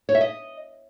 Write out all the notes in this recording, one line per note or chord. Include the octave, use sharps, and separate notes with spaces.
C#5
E5
D#5